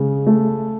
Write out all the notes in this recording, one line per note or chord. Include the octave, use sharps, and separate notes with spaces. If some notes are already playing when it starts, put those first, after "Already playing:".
Already playing: C#3 G#3
A3